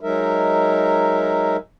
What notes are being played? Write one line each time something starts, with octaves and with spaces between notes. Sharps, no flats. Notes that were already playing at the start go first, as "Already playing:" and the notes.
F#3 G#3 D#4 A#4 E5